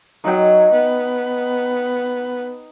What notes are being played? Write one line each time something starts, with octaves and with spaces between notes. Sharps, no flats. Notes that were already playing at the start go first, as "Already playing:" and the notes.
F#3 D#4 G5
B3